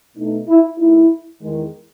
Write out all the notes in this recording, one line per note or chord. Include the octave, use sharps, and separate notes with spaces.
B2 A3 D#4
E4
D#3 A3 D#4 E4
E2 D#3 G#3